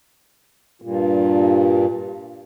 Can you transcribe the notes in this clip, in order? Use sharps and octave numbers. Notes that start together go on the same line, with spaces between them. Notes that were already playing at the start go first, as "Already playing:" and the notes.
G2 A#2